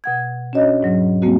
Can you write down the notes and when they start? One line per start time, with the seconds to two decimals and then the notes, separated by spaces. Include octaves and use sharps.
0.04 B2 F#5 G#6
0.53 C#4 D4 F#4 C#5 D#5
0.81 D#2 G#2 F#3
1.22 G3 A3 A#3 C4 F#4